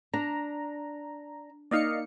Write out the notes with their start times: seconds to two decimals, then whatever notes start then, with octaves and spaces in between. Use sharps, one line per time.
0.14 D4 A#5
1.71 A#3 D#4 D5 D#5 F5 C#7